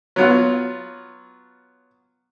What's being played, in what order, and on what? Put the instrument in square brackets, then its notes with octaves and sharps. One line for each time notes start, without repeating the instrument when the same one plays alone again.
[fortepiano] F#3 B3 F4